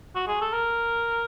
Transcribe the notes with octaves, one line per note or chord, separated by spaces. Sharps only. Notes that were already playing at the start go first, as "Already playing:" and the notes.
F#4
G#4
A4
A#4